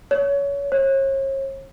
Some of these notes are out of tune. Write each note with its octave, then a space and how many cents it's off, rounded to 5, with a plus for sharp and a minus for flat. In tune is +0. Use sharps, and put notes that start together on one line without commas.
C#5 +25
C#5 -40